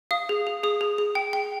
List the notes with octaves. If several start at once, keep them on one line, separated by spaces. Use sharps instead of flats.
F5 D#6
G#4
G#4
G#4 D#6
G#4
G#4
G5
G5